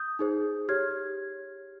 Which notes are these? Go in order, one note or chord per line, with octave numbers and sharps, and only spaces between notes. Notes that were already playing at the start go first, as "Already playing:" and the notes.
Already playing: D#6 G6
D#4 G#4 C5
G4 C#5 F6 G#6